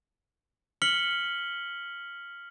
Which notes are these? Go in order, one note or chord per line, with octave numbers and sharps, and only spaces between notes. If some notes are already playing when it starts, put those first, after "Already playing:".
F6 B6 C#7 F#7 G7